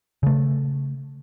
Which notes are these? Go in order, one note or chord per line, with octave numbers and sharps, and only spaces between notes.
C#3 A3